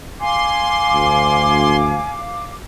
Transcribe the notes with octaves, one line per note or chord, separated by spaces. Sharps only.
F5 G#5 C6 D6
D2